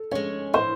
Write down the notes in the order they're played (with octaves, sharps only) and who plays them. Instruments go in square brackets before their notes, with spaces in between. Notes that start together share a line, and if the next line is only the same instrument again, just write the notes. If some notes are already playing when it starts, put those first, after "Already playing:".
Already playing: [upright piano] A4
[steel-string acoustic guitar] G#3 C#4 [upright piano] C#5
[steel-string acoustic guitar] A2 [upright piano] C5